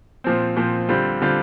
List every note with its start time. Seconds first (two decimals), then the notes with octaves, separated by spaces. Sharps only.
0.24 A#2 F3 C4
0.56 A#2 F3 C4
0.89 D3 G3 C4 F4
1.22 D3 G3 C4 F4